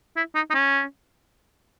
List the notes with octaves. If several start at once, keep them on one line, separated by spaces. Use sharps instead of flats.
E4
D#4
D#4
C#4